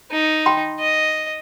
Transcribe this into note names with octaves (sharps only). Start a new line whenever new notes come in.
D#4
G5 B5 C6
D#5